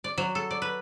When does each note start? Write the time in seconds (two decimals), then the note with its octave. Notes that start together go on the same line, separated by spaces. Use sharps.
0.04 D5
0.18 F#3
0.35 A4
0.51 D5
0.62 B4